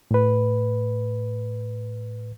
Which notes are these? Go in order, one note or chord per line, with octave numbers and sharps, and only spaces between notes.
A2 B4